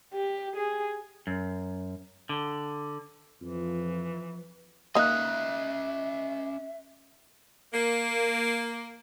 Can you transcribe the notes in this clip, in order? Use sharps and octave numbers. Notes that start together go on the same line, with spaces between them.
G4
G#4
F#2
D3
F2 E3 F3
A#3 C#4 D#4 D#5 E5 D#6 F#6
A#3